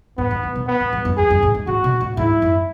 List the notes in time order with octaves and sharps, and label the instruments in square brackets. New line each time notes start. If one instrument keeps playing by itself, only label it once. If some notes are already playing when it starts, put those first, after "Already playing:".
[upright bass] G#2 [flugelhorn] B3
[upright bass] G#2
A2
B2
[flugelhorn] B3
[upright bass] A2
G#2
F#2
[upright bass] E2 [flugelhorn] G#4
[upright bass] F#2
A2
G#2
[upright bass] A2 [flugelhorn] F#4
[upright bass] B2
A2
[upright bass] G#2 [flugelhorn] E4
[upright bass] F#2